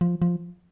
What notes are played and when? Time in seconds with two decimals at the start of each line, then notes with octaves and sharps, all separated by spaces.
0.01 F3
0.22 F3